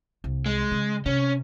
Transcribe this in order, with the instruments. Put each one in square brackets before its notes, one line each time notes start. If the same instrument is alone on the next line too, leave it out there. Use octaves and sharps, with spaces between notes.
[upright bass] C2
[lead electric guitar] G#3
[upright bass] C#3
[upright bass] C3 [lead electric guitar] C#4